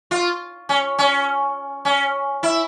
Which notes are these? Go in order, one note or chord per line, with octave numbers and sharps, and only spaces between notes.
F4
C#4
C#4
C#4
E4